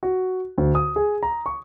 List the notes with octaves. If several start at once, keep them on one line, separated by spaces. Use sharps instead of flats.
F#4
D2
D#6
G#4
A#5
C#6